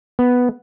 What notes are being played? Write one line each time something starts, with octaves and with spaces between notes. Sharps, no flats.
B3